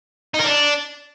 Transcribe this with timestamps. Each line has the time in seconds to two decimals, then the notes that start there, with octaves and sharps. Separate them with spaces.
0.34 D#4
0.39 A#4
0.44 D4